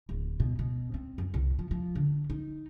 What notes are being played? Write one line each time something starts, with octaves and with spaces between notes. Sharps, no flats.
D1
B2
B2
C4
F#2
C2
F3
F3
D3
D#4